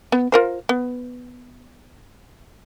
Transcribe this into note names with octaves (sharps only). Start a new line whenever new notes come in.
B3
F4 A#4 C5
B3